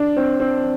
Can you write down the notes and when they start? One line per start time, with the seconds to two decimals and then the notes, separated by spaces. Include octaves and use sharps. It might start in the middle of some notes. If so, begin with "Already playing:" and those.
Already playing: D4
0.16 C4
0.40 C4